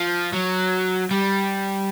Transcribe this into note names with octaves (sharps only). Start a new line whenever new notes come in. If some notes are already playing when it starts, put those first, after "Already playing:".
Already playing: F3
F#3
G3